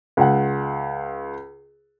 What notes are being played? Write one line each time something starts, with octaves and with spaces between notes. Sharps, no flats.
C#2 F#5